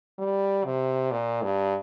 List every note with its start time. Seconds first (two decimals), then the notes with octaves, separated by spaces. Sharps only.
0.19 G3
0.65 C3
1.12 A#2
1.43 G2